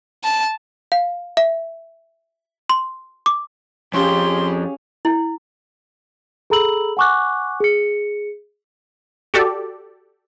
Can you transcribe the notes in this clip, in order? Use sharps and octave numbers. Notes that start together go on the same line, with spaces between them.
A5
F5
E5
C6
D6
F2 C#4 G4 G#4 F5 C6
E4
G#4 A4 A#5 B5 E6 F#7
F#5 G#5 C#6 D6 F#6
G#4 C#7
F#4 G4 A4 D5